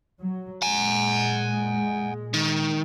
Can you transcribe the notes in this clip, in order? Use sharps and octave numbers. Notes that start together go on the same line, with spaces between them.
F#3
A#2 G#3 F#5 G#5
D#3